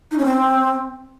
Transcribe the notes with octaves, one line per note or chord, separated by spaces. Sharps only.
D#4
C#4
C4